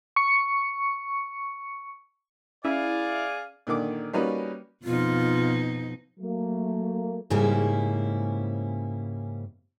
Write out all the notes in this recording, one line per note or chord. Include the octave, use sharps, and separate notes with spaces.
C#6 C#7
C#4 E4 G#4 D5 F5
A#2 D3 D#3 D6
G3 A#3 C#4 D#4 F#4 B4
F2 B2 D#4 F4
F#3 A3 A#3
G#2 C#3 G3 A#3 C#4 E4